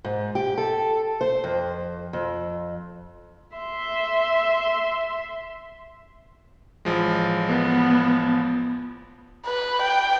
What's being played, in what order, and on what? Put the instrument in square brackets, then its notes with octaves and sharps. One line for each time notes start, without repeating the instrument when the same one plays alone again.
[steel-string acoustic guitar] G#2
G4
A4
C5
F2
F2
[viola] E5 C6
[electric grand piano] A1 F3 G#3
[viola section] B3
[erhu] B4
G5